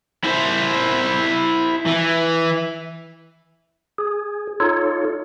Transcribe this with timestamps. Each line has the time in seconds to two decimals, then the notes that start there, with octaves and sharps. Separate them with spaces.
0.24 E4 C5
1.87 E3
3.98 G#4
4.60 D#4 F4 A4 C#5